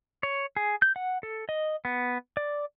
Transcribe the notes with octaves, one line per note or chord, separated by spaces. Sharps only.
C#5
G#4
G6
F#5
A4
D#5
B3
D5